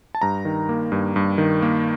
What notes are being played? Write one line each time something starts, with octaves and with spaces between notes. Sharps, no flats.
A5
G2 A#5
D#3
A#3
G2
G2
D#3
A#3